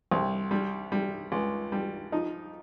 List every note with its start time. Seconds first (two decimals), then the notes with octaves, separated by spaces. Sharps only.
0.12 C2
0.51 G3
0.92 G3
1.32 C#2
1.72 G3
2.12 F3 D#4